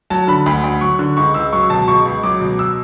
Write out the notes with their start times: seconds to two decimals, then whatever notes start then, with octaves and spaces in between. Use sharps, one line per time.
0.10 F#3 A5
0.28 D3 B5
0.46 D2 B5
0.64 D2
0.81 F#3 C#6
0.99 D3
1.17 C#2 C#6
1.34 C#2 E6
1.53 F#3 C#6
1.70 B2 A5
1.88 C#2 C#6
2.05 C#2
2.23 F#3 D6
2.41 B2
2.59 E6